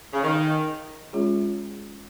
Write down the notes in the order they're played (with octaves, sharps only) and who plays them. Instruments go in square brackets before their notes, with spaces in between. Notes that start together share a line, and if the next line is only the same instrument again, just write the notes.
[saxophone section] C#3
D#3
[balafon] G#3 C#4 F4 G#4 C#5